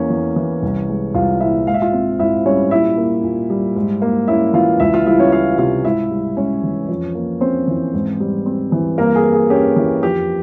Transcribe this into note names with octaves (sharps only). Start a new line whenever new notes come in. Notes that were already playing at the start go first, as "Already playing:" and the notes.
Already playing: E2 A#3 C#4 C#5
E2
E3
C2
G#3
C2 F4 F5
A#2 E4 E5
G#2 F5
E5
F4 F5
C4
G#2 E4 E5
G3 C#4 C#5
A#2 E4 E5
A#3
A#2
G3
G#2
A#3
C#4 E4 E5
E3 F4 F5
C#2 E4 E5
F4 F5
G3 E4 E5
C#4 C#5
C#4 F4 F5
C3 F4 F5
G#2 E4 E5
G3
G#2 C#4 C#5
E3
F2
A#3
C4 C#4 C5
E3
G#2
G3
C4
E3
G2 A#3 A#4
G#4
A#3
G#4
C#4 G4
E3
F2 G4